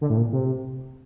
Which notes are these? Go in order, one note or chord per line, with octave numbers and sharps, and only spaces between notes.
D3
A2
A#2
C3